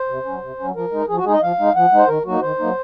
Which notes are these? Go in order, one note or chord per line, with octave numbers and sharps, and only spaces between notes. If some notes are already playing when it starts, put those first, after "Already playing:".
Already playing: C5
C3
F#3 C#4
C3
F#3 C#4
F3 A#4
G#3 D#4
F3 G#4
F#4
G#3 D#4 G#4 D#5
F3 F5
G#3 D#4
F3 F#5
G#3 D#4 C5
D#3 A#4
F#3 A#3 D#4 F#4
D#3 C5
F#3 A#3 D#4